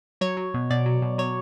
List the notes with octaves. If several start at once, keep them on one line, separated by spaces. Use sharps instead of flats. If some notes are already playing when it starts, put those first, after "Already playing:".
F#3 C#5
F#3
B2
B2 D5
F#3
B2
F#3 C#5